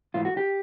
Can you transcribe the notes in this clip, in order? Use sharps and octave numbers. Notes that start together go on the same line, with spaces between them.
G#2 E3 A3 F4
F#4
G4